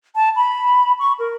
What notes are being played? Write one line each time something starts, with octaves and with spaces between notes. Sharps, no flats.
A5
B5
C#6
A#4